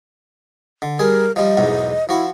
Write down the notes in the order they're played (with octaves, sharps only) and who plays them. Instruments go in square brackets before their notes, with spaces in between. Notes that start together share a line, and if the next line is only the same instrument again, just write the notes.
[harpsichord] D3
[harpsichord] G3 G#4 [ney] A#4
[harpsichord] F3 G3 [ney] D#5
[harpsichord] B1 E2 G#2
[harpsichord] F3 F#4 [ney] E4